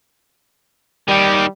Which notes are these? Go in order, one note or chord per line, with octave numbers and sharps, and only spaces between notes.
D#3 G3 G4